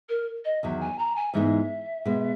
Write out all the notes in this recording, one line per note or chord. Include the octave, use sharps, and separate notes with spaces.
A#4
D#5
E2 D#3 F#3 E5
G#5
A#5
G#5
G#2 E3 G#3 B3 D#4 E5
B2 G#3 B3